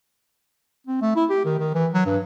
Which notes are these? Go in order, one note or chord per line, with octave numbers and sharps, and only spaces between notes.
C4
A3
E4
G4
D#3
D#3
E3
F#3
G2